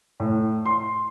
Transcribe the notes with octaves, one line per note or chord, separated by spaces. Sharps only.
A2
C6